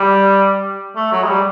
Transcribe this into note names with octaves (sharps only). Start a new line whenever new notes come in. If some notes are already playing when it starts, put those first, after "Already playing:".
Already playing: G3
A3
F#3
G#3
G3